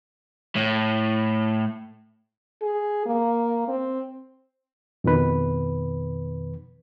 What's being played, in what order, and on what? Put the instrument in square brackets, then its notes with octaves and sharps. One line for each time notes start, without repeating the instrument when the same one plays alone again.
[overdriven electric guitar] A2
[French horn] G#4
A#3
C4
[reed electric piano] F2 B2 D#3 B4